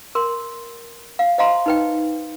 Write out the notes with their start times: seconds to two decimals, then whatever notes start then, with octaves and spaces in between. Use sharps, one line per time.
0.15 A#4 C6
1.19 F5
1.38 C5 D#5 F5 A#5 C6
1.66 D#4 B4 G5